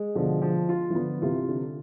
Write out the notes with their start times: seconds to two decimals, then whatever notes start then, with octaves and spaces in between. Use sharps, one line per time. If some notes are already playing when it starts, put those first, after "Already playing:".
Already playing: G#3
0.15 B2 D3 F3
0.42 F3
0.69 F4
0.90 E3
0.95 D3 F3 B3
1.22 C3 E3 F4
1.48 D3